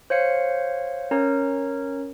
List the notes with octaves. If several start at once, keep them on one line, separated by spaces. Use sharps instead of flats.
C5 C#5 F5 C#7
C#4 A#4 C#5 A#5